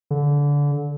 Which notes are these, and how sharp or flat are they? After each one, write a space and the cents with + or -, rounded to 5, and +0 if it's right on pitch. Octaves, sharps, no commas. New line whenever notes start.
D3 -25